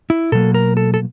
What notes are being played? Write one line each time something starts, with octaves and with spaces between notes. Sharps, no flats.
E4
B2 F#3 A#3 A4
A#4
A4
A4